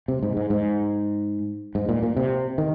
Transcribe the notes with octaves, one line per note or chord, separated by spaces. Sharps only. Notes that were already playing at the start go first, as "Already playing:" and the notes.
C3
G#2
G#2
G#2
G#2
A#2
A#2
C3
D#3